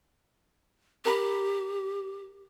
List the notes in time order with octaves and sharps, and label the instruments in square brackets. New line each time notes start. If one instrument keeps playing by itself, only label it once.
[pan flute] G4 [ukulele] A#4 A#5 B5